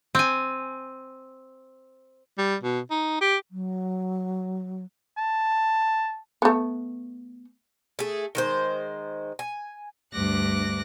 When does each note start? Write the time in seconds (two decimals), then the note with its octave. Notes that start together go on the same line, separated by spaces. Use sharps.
0.15 C4 G#5
2.38 G3
2.63 B2
2.91 D#4
3.21 G4
3.50 F#3
5.18 A5
6.42 A3 B3
7.99 A3 G#4
8.35 D#3 G#3 C5
9.39 G#5
10.13 D2 G2 D6 F#6 A#6